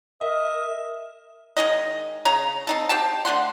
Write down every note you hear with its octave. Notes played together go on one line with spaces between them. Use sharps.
A#4 D#5 E5
D#3 G#3 D#4 D#5
C#3 A#5
C4 D#4 A4
G4 C5 G5 A5
D3 A3 F#5 C6